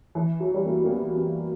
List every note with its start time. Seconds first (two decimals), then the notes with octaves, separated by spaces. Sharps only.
0.15 E3
0.40 F#3
0.54 G3
0.66 A#3
0.84 A#3
0.91 B3
1.16 B3